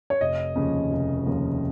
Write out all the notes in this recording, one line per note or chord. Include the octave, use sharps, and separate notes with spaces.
C#5
F1 D#5
D#2 C#3 F3
F1
D#2 C#3 F3